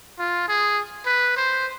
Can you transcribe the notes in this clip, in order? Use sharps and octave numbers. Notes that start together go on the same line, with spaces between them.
F4
G#4
B4
C5